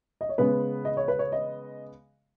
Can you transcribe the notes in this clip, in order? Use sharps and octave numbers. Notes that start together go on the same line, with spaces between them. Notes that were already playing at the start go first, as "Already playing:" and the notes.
D#5
C#5
C#3 G#3 B3 B4
D#5
C#5
B4
C#5
D#5